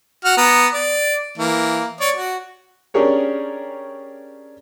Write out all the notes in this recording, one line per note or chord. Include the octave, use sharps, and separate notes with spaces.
F#4 F#5 F6
B3 A#5
D5
E3 A#3
C#5 D5
F#4
C#4 D4 G4 G#4 A#4 C#5